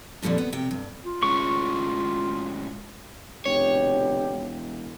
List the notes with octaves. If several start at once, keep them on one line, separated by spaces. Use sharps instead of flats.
F2 A#2 D3 G3 D4
B3
C3 G5
G2
F4
A2 G#3 C#4 C#6
F1 B2 D3 G4 C#5
E1